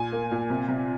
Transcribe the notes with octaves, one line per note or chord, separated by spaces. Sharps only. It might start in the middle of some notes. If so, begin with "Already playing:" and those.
Already playing: A#2 G#5
A#3
A#2
C3
C3